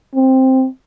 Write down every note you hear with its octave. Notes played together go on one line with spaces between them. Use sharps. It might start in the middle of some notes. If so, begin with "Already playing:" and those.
C4